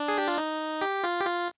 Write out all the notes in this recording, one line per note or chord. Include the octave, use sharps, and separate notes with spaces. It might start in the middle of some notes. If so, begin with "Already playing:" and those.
Already playing: D4
G#4
G4
F4
D#4
G4
F4
G4
F4